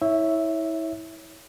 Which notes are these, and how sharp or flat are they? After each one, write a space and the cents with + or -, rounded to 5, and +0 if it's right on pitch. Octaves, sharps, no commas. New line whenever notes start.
E4 -30 C#5 +0 E5 +0